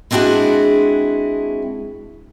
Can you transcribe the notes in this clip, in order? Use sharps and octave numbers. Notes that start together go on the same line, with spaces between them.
G#3 C4 D4 E4 F#4 G#4